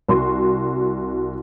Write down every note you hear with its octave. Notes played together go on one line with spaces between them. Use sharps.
C2 F#4 C6